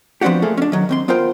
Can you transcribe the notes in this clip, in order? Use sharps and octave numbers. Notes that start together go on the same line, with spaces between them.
F3 B3 C4 D4 F#4 G4
A3 A#3 G#4 A4
C#4 D4
D#3 F#3
D#2 C4 C6
B3 F4 A#4 C5 G5